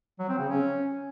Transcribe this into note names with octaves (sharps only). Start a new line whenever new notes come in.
F#3
C4
C#3
C#4